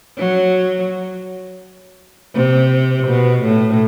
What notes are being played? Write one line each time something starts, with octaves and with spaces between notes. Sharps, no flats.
F#3
C3
B2
A2